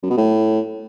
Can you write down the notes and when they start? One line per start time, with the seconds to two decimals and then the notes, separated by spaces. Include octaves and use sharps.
0.03 F#2
0.10 B2
0.17 A2